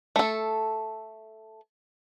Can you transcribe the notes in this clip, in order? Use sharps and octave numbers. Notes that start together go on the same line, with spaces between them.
A3 A4